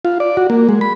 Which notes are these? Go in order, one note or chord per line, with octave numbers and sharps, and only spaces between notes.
F4
D5
F#4
A#3
G#3
B5